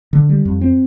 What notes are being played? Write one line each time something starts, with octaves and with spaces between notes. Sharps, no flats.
D3
G3
F2
C4